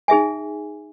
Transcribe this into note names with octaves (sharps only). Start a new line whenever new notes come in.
D#4 G#4 E5 G#5